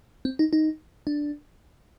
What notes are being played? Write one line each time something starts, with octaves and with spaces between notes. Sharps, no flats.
C4
D#4
D#4
D4